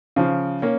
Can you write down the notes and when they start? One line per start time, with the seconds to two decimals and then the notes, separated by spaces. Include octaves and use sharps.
0.16 C#3 F3
0.62 A#3 C#4